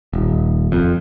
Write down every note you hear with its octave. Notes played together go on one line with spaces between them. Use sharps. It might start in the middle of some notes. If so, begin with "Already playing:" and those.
D#1
F2